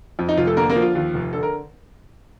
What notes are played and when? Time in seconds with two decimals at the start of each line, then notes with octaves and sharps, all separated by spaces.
0.19 F2
0.29 D#4
0.37 F1 F4
0.47 A3 A4
0.57 D3 A#3 A#4
0.70 A#3 A#4
0.76 F3
0.82 F4
0.95 D#2 F4
1.14 F1
1.33 D3 A4
1.43 A#4